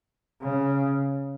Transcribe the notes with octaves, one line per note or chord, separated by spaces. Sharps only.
C#3